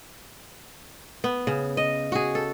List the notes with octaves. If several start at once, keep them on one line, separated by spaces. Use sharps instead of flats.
B3
C#3
D#5
F#4 G#4
A4